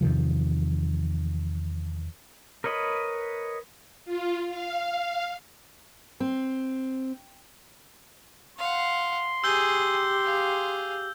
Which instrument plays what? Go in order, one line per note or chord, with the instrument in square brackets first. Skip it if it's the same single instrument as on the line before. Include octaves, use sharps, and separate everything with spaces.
[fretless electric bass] E2 C3 D#3 F3
[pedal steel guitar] A#4 B4 C#5 D#5 B5
[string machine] F4
F5
[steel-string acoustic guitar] C4
[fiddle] F5 F#5 [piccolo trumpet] C6
[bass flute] G4 [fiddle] G#4 [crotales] E6 G6 G7
[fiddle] G#4 F5